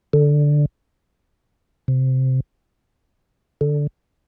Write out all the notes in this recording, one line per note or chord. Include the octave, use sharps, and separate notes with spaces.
D3
C3
D3